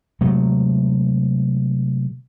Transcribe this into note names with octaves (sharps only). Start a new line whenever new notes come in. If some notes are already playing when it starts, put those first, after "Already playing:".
C3 F#3 G#3 A3